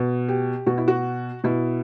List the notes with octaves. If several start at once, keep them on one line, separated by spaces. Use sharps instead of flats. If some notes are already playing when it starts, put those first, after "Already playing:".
Already playing: B2
G4
B2 F#4
E4
F#4
B2 E4